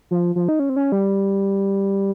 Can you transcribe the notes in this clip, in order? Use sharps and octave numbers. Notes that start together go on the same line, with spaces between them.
F3
F3
D#4
C#4
C4
C#4
G3